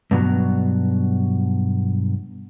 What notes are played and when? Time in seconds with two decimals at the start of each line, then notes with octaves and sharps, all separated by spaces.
0.11 G2 B2 F#3